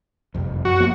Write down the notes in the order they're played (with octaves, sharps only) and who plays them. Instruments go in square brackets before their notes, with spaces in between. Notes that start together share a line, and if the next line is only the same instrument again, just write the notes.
[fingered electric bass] F#1 C2 F2
[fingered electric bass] F#2 [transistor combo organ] F#4
[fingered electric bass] F3 A#3 B3